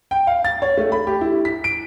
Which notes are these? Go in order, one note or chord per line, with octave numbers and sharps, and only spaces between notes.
G5
F5
A6
C#5
A3
B5
G4
E4
B6
D7